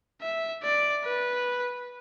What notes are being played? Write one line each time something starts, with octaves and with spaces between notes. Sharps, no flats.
E5
D5
B4